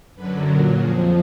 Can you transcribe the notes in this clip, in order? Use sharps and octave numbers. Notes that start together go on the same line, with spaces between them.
F#2 D3 F#3 B4
A#2 F#3 A#4
F2 F3 G#4